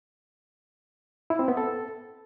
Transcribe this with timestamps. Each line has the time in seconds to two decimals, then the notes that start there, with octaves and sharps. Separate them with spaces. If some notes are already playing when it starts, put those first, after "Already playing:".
1.30 E4
1.39 C4
1.48 B3
1.57 A4